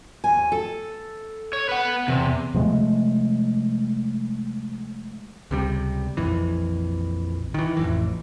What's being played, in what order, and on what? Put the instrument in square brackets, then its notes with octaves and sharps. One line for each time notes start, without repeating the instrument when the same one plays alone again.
[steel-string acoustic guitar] D#2 G#5
A4
[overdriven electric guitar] C#5
B4 F#5
[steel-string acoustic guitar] E2 [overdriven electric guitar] C3
[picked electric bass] C3 F3 G#3 A3
C#2 C3 G3
A#1 F2 E3
D#3 E3
A1 F2 E3